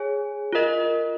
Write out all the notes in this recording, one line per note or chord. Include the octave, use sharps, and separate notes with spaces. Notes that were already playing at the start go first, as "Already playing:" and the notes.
Already playing: G#4 C#5 G#5
F4 A#4 D#5